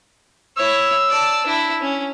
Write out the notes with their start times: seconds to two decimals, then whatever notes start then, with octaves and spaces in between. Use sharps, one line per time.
0.57 E4 C#5 E6
1.09 D5 A5
1.47 D4 E4
1.81 C#4